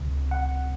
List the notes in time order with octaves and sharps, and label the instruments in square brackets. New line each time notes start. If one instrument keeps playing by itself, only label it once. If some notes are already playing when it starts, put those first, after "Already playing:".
Already playing: [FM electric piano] C#2 C3
F#5